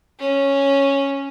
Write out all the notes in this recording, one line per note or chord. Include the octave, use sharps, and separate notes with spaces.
C#4